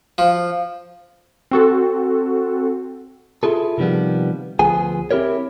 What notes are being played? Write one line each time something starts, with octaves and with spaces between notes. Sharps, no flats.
F3
C4 F#4 A4
E4 F4 G#4 A4
C3 D#3 F3 G3 B3
D2 F3 B3 G#4 G#5
C4 E4 G4 A#4 C#5